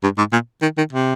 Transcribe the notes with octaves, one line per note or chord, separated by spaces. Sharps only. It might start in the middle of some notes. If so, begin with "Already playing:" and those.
G2
G#2
A#2
D#3
D#3
C3